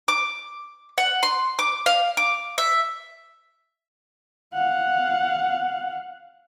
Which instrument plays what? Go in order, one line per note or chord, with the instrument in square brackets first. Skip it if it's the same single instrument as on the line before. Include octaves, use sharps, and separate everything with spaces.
[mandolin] D6
F#5
C6
D6
F5
D6
E5
[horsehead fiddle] F5 F#5